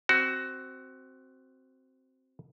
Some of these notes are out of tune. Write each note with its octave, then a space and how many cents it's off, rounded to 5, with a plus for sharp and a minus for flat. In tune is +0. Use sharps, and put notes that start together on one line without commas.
C4 +0 F#4 +15